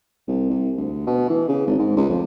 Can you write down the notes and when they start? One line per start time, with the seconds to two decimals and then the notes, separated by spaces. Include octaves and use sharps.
0.28 C2
0.50 C2
0.77 D2
1.07 B2
1.30 E3
1.49 C#3
1.67 G#1
1.79 G#2
1.97 C#2
2.10 F2